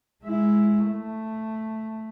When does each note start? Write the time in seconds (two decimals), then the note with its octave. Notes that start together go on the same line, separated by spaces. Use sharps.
0.24 G#3 E4
0.86 A3